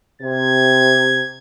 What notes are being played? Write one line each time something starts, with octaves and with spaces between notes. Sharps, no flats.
C3 G#6